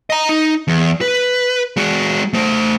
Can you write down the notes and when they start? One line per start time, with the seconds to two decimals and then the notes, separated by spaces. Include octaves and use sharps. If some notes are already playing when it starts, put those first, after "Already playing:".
0.10 D#5 A#5
0.29 D#4
0.68 E2
1.01 B4
1.77 G#3 F#4
2.33 A3 C5